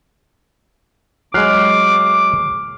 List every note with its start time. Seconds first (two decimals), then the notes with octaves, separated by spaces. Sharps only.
1.34 F#3 G#3 D6 F6 F#6 C7